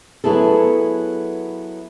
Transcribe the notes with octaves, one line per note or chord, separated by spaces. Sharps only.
F#3 B3 E4 G#4 A4